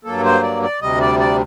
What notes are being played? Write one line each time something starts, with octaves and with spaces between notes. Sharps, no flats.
G2 F#3 A#3 A4
C5
D5
D5
D2 C3 G3 D#5
D5
D5